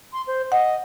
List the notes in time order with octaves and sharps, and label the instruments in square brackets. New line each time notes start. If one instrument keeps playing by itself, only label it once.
[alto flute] C6
C5
[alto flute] D#5 [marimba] F#5